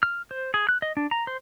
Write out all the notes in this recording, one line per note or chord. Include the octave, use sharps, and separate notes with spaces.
F6
C5
G#4
F#6
D#5
D4
A#5
C5